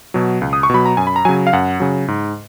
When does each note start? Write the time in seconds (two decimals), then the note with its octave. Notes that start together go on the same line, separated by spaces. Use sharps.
0.14 B2 F#3
0.42 C#2
0.53 D#6
0.63 C#6
0.70 B2 F#3 B5
0.86 A#5
0.97 F#2 G#5
1.07 B5
1.16 A#5
1.25 C#3 F#3 G#5
1.47 F5
1.53 F#2 F#5
1.80 C#3 F#3
2.08 G#2